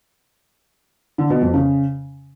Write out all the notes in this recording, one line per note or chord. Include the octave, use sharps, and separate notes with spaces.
D3
B2
F2
C#3